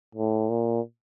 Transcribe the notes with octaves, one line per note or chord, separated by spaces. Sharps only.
A2
A#2